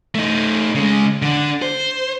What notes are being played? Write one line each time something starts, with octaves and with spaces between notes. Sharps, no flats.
A3 D#4
C#3 G#3
D3 D4
C5